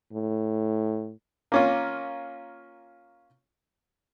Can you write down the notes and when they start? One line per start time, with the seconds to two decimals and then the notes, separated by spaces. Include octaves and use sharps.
0.13 A2
1.52 A#3 C#4 F4